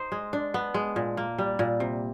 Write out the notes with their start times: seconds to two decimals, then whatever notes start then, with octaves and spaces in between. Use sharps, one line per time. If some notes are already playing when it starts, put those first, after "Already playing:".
Already playing: D#4 C5
0.12 G#3
0.33 D4
0.54 B3
0.74 G#3
0.96 A#2
1.17 A#3
1.39 G3
1.59 A#2
1.80 C3